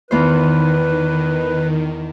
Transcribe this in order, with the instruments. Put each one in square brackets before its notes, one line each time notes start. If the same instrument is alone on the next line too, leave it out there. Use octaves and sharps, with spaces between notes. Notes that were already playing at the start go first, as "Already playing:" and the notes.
[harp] E2 B3 C5 [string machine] D#3 [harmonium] B4